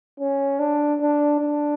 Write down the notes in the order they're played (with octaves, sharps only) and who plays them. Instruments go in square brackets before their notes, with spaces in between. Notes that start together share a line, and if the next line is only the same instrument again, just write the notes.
[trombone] C#4
D4
D4
D4